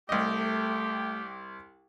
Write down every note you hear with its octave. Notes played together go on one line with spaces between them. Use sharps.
C2 A3 G4 D#5